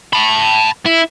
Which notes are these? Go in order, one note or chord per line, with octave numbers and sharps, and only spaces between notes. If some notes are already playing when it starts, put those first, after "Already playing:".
A5 B5
E4